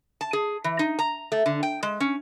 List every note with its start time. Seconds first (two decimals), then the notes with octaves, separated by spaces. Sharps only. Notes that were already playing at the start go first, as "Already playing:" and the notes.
0.21 A5
0.33 G#4
0.64 E3
0.79 D#4
0.99 A#5
1.32 A3
1.46 D3
1.63 G5
1.83 G#3
2.00 C#4